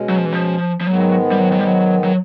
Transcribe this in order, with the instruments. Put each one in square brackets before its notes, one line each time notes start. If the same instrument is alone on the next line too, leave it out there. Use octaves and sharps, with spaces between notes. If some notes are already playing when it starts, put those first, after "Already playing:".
Already playing: [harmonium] B2 G#3 C#4
[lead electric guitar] F#3
F3
E3
F3
F3
[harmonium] G#2 D#3 G#3 B3 [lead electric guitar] F#3
[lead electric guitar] G3
F#3
F#3
G3
F#3
F#3